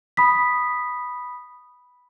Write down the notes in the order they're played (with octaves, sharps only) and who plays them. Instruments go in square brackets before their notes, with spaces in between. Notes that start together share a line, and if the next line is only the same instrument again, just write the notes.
[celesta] B5 D#6 B6